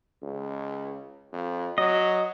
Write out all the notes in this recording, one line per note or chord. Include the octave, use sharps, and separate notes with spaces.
C#2
F2
F#3 D#5